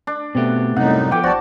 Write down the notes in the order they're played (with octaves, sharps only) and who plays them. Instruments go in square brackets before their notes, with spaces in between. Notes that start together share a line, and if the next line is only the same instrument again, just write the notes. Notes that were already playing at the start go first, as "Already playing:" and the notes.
[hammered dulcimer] D4
[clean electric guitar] B2 G4 [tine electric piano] A3 B3 C4
[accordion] F#2 A2 D#4 [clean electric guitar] C3 G3 [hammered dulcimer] F#5
[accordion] D3 E3 [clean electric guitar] F3 B3 [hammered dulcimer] D5 G5 D6
[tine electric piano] G1 C5 C#6 [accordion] G3 D5 [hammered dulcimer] F#4 A5